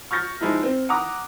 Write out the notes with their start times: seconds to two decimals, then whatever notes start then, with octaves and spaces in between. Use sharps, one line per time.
0.11 C#6 F6 G6 A6 A#6 C#7
0.41 F3 G#3 D#4 E4
0.63 C4
0.89 F#5 A#5 D6 D#6